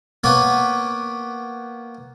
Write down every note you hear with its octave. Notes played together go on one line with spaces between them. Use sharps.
A#3 B3 B4 C#5 D6